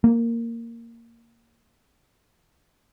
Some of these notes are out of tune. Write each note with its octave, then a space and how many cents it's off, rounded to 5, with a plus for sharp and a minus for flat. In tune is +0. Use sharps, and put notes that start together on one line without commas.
A#3 -10